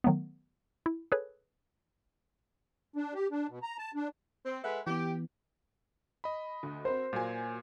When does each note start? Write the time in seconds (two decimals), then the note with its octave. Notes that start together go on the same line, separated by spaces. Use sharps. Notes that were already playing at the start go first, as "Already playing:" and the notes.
0.04 D#3 F#3 A3 B3
0.86 E4
1.12 G#4 A4 B4 C#5
2.96 D4
3.14 G4
3.31 D4
3.49 B2
3.63 A#5
3.78 A5
3.95 D4
4.46 C4
4.64 G#3 A4 B4 E5 F#5
4.87 E3 B3 G4
6.24 D#5 B5
6.63 D2
6.85 C4 F#4 A#4 C5
7.13 A#2 F#3 A#3 G#5